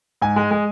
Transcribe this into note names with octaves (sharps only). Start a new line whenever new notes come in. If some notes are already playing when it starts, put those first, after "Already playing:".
G#2 G#5
G#3
G#3